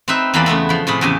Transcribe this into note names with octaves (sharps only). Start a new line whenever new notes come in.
C4 D#4 B4 E5
E2 E3 A#3 F4 D5 B5
C#3 A3 B3 E4
F3 B5
A2 C3 G#4 B5
E2 A2 C#3 G4 G#5